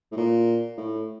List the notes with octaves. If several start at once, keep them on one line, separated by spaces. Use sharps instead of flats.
A2
A#2
A2